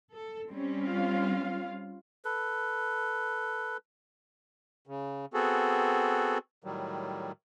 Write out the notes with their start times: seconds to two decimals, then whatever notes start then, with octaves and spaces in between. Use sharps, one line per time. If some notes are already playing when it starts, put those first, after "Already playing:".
0.15 A4
0.50 G3 C4 C#4
0.84 F4 F5
2.25 A4 B4
4.87 C#3
5.34 B3 C4 F#4 G#4 A4
6.64 A2 D#3 F#3 G3